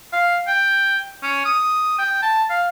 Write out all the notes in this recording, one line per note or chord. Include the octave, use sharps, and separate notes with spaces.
F5
G5
C#4
D#6
G5
A5
F5